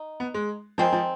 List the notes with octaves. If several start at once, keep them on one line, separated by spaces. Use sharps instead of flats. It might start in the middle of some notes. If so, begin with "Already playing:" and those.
Already playing: D#4
B3
G#3
D#3 F3 G#3 C4
F3